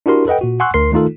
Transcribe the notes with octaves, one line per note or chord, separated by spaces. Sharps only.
D4 E4 F#4 G4 A#4 C6
A4 B4 D#5 F#5 G5
A#2 F#4
F#5 G#5 C6 C#6 E6 F#6
D2 A#4 C6 C7
D#3 A3 D#4 F4 A4